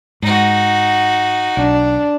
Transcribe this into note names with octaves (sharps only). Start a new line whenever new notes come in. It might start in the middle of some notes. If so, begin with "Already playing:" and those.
G#2 D#4 F#4
B1 D4